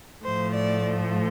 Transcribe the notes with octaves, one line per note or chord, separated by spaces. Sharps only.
A2 F3 A3 C5
D5